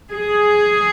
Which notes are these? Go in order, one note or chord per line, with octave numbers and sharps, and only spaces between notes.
G#4